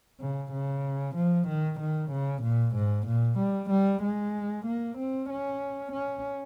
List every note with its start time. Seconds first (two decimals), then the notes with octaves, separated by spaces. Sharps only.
0.21 C#3
0.52 C#3
1.16 F3
1.48 D#3
1.80 D#3
2.12 C#3
2.43 A#2
2.76 G#2
3.07 A#2
3.39 G3
3.70 G3
4.03 G#3
4.66 A#3
4.98 C4
5.30 C#4
5.93 C#4